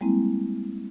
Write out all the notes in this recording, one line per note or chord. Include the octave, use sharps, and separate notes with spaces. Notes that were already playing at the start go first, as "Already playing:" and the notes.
G3 G#3 A#3 C4 E4